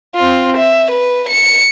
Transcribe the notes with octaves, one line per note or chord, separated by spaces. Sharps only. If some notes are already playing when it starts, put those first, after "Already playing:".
C4 F4
E5
B4
C#7